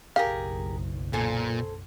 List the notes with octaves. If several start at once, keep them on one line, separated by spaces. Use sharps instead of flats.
F#1 B1 G4 G#4 A#4 F5
A#2 A4 C5 G#5